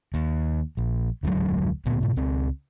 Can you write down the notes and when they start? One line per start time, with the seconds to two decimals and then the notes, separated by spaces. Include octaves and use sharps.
0.14 D#2
0.77 A#1
1.23 F1 D2 G#2 F#3
1.85 D2 A#2 B3
2.00 G#2 B2
2.16 C#2 C4